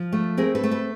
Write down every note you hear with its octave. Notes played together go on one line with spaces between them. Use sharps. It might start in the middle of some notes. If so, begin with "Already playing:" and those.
Already playing: F3
A3
C4 G#4 A#4
A4 B4
A3
A4 B4